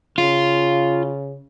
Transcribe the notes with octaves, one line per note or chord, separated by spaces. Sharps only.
C#3 F4